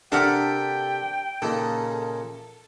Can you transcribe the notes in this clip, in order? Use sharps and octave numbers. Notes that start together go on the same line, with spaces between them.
C3 D4 A4 A#4 E5 F#5 G5
A#2 C#3 D#4 A4